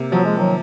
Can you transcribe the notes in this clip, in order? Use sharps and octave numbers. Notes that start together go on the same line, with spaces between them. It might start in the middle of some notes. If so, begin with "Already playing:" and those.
Already playing: C3 A#3
F3 F#3
G#3
D#3 F#3